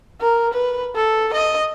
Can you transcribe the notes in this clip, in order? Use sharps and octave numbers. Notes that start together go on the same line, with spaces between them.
A#4
B4
A4
D#5